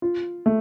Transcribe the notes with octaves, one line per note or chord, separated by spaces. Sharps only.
F4
A3